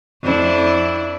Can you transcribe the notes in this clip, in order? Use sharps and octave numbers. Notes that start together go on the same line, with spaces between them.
F2 D4 E4